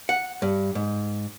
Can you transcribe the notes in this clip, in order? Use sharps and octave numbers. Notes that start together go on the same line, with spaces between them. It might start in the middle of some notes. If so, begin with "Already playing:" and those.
F#5
G2
G#2